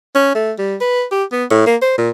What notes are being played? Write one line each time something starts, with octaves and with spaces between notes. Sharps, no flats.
C#4
A3
G3
B4
G4
B3
A2
A#3
C5
A#2